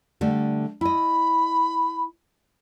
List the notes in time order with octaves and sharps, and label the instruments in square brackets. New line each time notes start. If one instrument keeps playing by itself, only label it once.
[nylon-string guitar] D3 G3 A3
[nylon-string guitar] E4 D#5 [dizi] B5